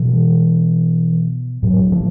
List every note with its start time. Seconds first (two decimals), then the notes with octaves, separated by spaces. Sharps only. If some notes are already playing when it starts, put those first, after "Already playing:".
Already playing: B2 E3
1.63 A2 F#3
1.92 F3